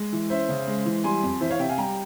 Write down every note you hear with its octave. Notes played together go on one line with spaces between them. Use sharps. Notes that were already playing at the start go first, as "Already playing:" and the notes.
Already playing: G#3
E3
C#4 C5 E5
C#3
G#3
E3
G3 G#5 C6
F2
E3 C5 E5
C#5 F5
C3 E5 G5
F5 G#5
G3 G5 A#5